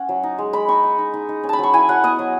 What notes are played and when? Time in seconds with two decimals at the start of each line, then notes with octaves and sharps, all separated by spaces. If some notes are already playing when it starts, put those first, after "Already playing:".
Already playing: C#4 F#5
0.09 F#3
0.23 D#4
0.38 G#3
0.53 G#3 B5
0.69 D#4 C#6
0.84 D#4
0.98 D#4
1.14 D#4
1.29 D#4
1.44 C#4
1.49 A5 B5
1.59 F#3 C#6
1.74 E4 G#5
1.89 F#3 F#5
2.03 B3 D#5
2.19 F#3